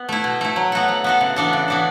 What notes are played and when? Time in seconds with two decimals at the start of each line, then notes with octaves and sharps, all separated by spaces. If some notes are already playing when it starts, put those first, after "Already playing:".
Already playing: B3
0.09 A3 E4
0.24 B2
0.41 A3 E4
0.56 F#3
0.72 B3 F#4 A4
0.88 F#3
1.04 B3 F#4 A4
1.21 C#3
1.36 E3 B3 D4 A4
1.53 C#3
1.68 E3 B3 D4 A4